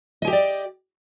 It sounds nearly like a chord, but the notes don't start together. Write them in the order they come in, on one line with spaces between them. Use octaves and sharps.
D#5 G#5 G4 G5 D5